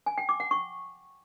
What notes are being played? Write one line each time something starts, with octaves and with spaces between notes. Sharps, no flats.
G#5
G5
D6
F#5
C#6